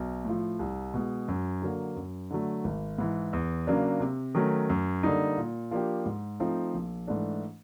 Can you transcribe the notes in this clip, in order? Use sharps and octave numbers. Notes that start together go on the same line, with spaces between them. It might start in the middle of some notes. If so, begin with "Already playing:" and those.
Already playing: B1
A2 F3
C2
B2 G#3
F#2
D3 F#3 A#3
F#2
D3 F#3 A3
G#1
G#2 E3
E2
C#3 F#3 A#3 D4
C3
D#3 F#3 A3 C#4
F#2
D3 G3 A#3 D#4
A#2
F3 A#3 D4 G4
G#2
F3 A3 C4 D#4
A#1
G#2 E3 A3 D4